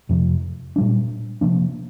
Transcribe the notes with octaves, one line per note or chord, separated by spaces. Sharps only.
F2 C3 F3
A#2 G3 D4
C3 F3 A#3 D4